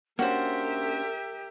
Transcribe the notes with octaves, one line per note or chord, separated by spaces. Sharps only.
A#3 C#4 D4 F#4 G4 A#4 C5 E5